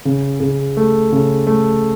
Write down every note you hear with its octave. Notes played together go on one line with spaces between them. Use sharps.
C#3
C#3
A3
C#3
A3